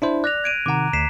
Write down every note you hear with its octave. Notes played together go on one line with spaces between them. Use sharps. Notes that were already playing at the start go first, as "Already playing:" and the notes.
D4 E4 C5
D5 F#6 A#6 F7
G#6 D7 D#7
C3 D#3 F#5 A#5 D6
D2 B6 C7 E7